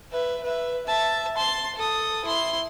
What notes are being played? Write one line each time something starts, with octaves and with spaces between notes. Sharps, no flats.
B4 E5
B4 E5
E5 A5
A5 C6
A4 D#6
E4 C6